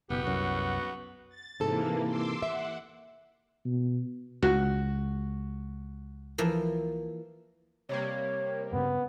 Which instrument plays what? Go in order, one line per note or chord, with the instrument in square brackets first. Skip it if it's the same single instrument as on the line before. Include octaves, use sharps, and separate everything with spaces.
[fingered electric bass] F#1 B2 [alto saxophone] B3 [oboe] G4
[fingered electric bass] C2 F#2 [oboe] F#4
[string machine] A6
[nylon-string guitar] G#2 C3 A4 [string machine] E3 A#3
[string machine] C6 D6 E6
[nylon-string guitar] E5 [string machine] F#5
[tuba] B2
[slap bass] C#2 [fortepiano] F#4
[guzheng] E3 F3 A#3
[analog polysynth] C3 G3 A#3 [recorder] C#5
[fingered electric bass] G2 C#3 [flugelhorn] B3